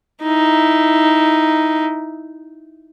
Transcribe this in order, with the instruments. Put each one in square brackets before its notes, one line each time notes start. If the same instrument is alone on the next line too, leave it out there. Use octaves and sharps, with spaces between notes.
[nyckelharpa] D#4 E4